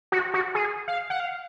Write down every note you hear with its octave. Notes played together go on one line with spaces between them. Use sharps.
F#4
F#4
G#4
F5
F#5
F5